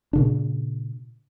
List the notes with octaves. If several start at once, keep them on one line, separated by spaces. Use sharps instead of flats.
A#2 C#3 D4